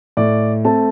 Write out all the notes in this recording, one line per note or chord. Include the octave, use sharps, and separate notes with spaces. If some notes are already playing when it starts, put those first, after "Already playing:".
A2 D5
A3 C4 A5